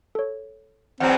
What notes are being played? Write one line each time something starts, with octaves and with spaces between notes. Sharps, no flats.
A4 C#5
E2 F#3 G3 C4 F#5 G5 A#5